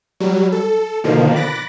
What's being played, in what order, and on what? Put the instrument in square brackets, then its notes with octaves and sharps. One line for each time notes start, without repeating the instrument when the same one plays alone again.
[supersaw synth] F#3 G3
A4
B2 D3 D#3 F3 A#3
B5 D6 F#6 A6 A#6